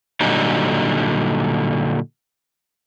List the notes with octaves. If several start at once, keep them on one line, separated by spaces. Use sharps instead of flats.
A#2 D3 F#3 G3 D#4